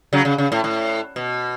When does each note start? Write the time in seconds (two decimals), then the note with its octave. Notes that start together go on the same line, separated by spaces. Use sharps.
0.13 C#3 F#3
0.25 C#3
0.38 C#3
0.52 A2
0.64 A2
1.16 B2